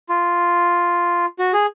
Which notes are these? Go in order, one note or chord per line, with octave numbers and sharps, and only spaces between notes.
F4
F#4
G#4